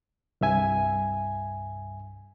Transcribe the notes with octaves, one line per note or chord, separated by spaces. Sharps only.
C2 G2 E5 G#5